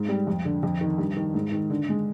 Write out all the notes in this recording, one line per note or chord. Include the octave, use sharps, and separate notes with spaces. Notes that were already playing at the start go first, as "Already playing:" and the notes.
Already playing: G#2
G3
F2
D3
F2
D#3
G2
D#3
G#2
D#3
D3
G#3